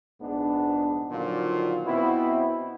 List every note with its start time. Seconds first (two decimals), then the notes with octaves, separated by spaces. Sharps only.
0.21 A#1 G#2 B3 D4
1.11 A#2 D3 D#3 F3 F#3 F4
1.84 B2 B3 C4 E4